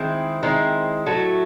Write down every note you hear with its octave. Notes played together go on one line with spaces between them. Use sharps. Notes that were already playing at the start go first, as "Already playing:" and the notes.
Already playing: D#3 G#3 C4 E4
D#3 G#3 C4 E4
A2 F#3 A3